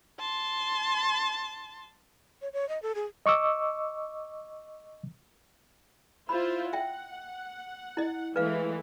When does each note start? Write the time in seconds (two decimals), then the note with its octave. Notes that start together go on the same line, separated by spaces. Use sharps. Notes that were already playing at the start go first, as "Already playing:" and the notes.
0.19 A5 C6
2.42 C#5
2.53 C#5
2.69 D#5
2.82 A4
2.95 G#4
3.26 D#5 C#6 D6 E6
6.29 E4 F4 C5 B5
6.73 E5 F#5 G5
7.97 E4 D#5
8.36 E3 G#3 A3 B4 F5